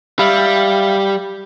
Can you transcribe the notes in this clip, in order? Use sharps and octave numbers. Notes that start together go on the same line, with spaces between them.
G3 E5 F5 B5